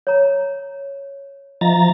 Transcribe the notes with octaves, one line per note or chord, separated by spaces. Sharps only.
C#5 A#5
F3 D#5 E5 A#5 A6